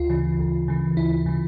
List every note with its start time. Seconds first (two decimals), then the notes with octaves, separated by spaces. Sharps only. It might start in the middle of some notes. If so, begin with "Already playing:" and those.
Already playing: D2 F4
0.10 C#3 E3
0.39 D2
0.68 C#3 E3
0.97 D2 E4
1.26 C#3 E3